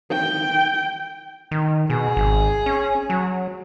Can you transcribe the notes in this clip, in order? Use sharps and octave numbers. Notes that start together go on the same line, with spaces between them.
G5
D#3
B2 G#4
G#1
C#4
F#3